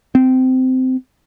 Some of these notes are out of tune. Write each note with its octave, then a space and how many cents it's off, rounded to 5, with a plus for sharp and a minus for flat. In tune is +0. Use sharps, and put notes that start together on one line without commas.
C4 -20